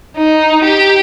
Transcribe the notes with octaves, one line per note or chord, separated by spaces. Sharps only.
D#4
G4